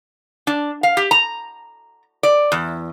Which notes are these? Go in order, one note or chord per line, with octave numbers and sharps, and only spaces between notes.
D4
F5
G4
A#5
D5
E2